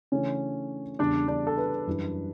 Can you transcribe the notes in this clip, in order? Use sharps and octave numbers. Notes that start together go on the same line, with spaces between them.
C#3 E3 A3 C#4 D4 C#5
E2 C#3 G3 D4 D5
D4 D5
A4
B4
F#2 E3 G3 D4